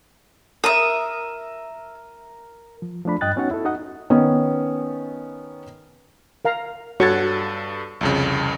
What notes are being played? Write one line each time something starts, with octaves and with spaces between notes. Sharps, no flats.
A#4 E5 D#6
F3
F3 A3 D4 B5
G2 D#5 G5 F#6 A6
B3 C#4 D#4 F#4 C#5 F#5
E4 A4
D#4 F#4 D#5 F#5
D#3 B3 C#4
A#4 F5 A#5
G2 F#4 A4 C#5 C#6 A6
C2 F2 C#3